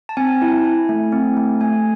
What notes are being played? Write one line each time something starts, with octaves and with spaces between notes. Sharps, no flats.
A5
C4 G#5
E4
E4
A3
C4
A3
A3 G#5